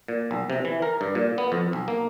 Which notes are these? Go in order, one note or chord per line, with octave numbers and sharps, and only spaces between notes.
A#2
B1
C3
E3
A#4
G2
A#2
B3
F2
B1
A#3